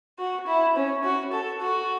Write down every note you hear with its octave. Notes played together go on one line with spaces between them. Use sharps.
F#4
E4
C#4
F#4
A4
F#4